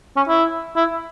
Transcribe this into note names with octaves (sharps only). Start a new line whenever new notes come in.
C#4
E4
E4